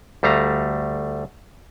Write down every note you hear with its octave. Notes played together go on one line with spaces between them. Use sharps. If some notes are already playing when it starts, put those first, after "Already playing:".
D2 G3 A3 F5 A#5